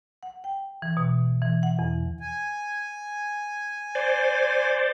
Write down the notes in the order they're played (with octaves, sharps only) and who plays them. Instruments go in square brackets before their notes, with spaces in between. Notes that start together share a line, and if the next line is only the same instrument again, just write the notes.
[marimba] F#5
G5
E3
B2
E3
F#5
E2
[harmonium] G#5
[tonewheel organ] C5 D5